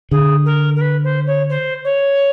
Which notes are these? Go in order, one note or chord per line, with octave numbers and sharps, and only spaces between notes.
D3 G#4
A#4
A#4
B4
C5
C#5
C5
C#5